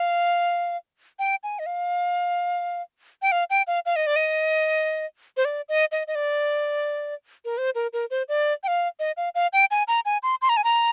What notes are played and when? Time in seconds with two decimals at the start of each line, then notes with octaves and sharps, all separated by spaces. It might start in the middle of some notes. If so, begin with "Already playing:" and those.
Already playing: F5
1.19 G5
1.43 G#5
1.59 D#5
1.66 F5
3.22 G5
3.32 F5
3.50 G5
3.67 F5
3.86 F5
3.96 D#5
4.07 D5
4.16 D#5
5.37 C5
5.45 D5
5.69 D#5
5.92 D#5
6.07 D#5
6.15 D5
7.45 A#4
7.58 C5
7.75 A#4
7.93 A#4
8.10 C5
8.29 D5
8.63 G5
8.68 F5
9.00 D#5
9.17 F5
9.35 F5
9.53 G5
9.71 G#5
9.88 A#5
10.05 G#5
10.23 C6
10.42 C6
10.49 A#5
10.57 G#5
10.64 A#5